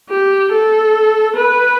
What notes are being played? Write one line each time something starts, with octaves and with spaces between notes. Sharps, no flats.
G4
A4
B4